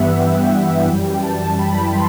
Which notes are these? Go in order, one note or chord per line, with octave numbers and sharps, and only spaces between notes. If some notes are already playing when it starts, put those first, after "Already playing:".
Already playing: G2 E3 G3 B3 E5 F#5
G5
F#2 E3 G3
A5
B5
C6